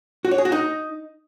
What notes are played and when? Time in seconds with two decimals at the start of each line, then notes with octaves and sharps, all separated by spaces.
0.25 F#4
0.31 C#5
0.38 G#4
0.45 F#4
0.52 D#4